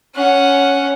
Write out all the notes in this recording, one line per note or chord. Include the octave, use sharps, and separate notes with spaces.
C#4 F#5